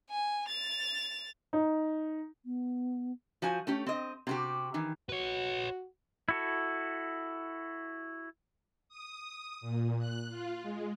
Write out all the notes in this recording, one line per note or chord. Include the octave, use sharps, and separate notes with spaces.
G#5
A6 F7
D#4
B3
F3 F#4 C5 G#5
A3 C#4 G4
C4 D#5
C3 F#4 G4
D#3 E3
F#4 B4 C#5
E4 F#4 A4
D#6
A#2
F#6
F4
G#3